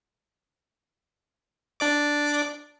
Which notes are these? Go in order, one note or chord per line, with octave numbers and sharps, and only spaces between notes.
D4 D5 D6